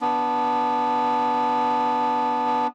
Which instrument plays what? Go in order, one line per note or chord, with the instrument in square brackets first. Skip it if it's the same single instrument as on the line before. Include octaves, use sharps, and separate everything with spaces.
[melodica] B3 D4